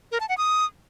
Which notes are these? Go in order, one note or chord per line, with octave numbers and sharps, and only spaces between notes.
A#4
A5
F#5
D#6